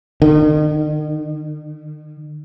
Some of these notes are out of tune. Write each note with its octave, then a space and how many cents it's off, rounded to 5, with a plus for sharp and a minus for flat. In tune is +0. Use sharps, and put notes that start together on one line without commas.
D#3 -40